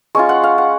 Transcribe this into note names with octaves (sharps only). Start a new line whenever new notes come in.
G#3 C#4 F4 C#6
F#5
F5
F#5